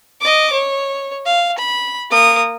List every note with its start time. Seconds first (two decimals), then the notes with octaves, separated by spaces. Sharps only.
0.21 D#5 D6
0.53 C#5
1.26 F5
1.58 B5
2.11 A#3 D#6